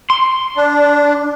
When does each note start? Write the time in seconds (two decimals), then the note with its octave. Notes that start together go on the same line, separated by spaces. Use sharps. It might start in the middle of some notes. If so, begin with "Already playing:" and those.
0.10 C6
0.56 D4